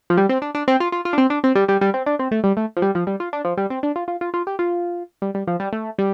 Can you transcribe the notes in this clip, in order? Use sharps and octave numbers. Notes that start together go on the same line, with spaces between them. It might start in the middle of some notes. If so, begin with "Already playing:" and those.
F3
G3
C4
D4
D4
C4
F4
F4
F4
D4
C4
D4
C4
G3
G3
G3
C4
D4
C4
A3
G3
A3
F3
G3
F3
G3
F4
D4
F3
G3
C4
D4
F4
F4
F4
F4
G4
F4
G3
G3
F3
G3
A3
G3